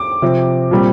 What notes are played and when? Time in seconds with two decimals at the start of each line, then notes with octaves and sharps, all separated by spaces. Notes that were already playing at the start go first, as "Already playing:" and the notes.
Already playing: D6
0.22 C3 F3 C4
0.71 A#2 G3 C4